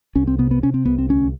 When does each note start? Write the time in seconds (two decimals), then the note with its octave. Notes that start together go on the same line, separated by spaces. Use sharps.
0.16 C2 C#4
0.27 C4
0.38 C3 B3
0.51 B3
0.63 C3 C#4
0.74 C4
0.86 C2 B3
0.98 C4
1.09 D2 C#4